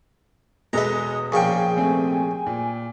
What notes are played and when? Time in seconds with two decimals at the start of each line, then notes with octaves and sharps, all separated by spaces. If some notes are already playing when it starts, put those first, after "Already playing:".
0.73 E1 G#3 A4 B4 D#5 A#5 D#6
1.32 A#1 C#3 G#4 F5 G5 C#6
1.77 C3 A3 C4 G#5
2.46 A#2